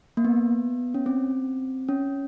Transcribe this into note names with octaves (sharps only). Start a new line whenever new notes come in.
A#3
B3
C#4
C4
C#4